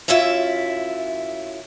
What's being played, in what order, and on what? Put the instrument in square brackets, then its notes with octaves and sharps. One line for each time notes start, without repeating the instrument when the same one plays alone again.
[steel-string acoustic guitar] F#2 C#4 E4 F4 E5